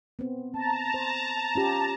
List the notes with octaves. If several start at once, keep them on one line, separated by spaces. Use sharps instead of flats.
B3 C4
C4 A5 A#5
C5
C#4 F4 G4